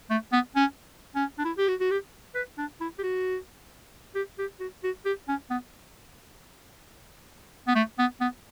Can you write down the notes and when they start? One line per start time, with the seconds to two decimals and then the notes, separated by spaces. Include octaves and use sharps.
0.10 A3
0.32 B3
0.56 C#4
1.15 C#4
1.39 D4
1.45 E4
1.57 G4
1.68 F#4
1.80 F#4
1.91 G4
2.35 B4
2.58 D4
2.80 E4
2.99 G4
3.03 F#4
4.15 G4
4.39 G4
4.60 F#4
4.84 F#4
5.05 G4
5.28 C#4
5.50 B3
7.68 B3
7.75 A3
7.99 B3
8.20 B3